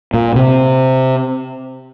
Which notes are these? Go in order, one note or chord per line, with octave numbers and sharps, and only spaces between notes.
A#2
C3